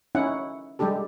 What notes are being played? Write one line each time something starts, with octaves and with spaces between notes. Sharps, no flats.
C#4 D#4 E4 F#5
G3 G#3 D4 G4 A4